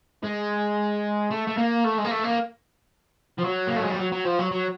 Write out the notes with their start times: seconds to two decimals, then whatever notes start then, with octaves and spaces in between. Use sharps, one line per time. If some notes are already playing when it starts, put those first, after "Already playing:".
0.24 G#3
1.31 A3
1.47 A3
1.57 A#3
1.84 A3
1.98 G#3
2.05 A#3
2.11 A3
2.24 A#3
3.39 F3
3.45 F#3
3.68 A#3
3.76 A3
3.84 G#3
3.91 G3
3.99 F#3
4.12 F#3
4.25 F3
4.39 F#3
4.52 F#3